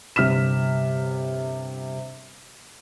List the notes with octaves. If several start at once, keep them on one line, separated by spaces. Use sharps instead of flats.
G1 C3 F6 B6 E7